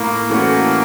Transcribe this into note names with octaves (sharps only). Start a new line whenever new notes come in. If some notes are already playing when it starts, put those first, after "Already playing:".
Already playing: A2 A#3
E3 A3 C#4 F#4